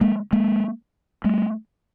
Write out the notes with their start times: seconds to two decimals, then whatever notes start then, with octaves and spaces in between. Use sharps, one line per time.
0.01 G#3 A#3
0.33 G#3 A#3
1.24 G3 A3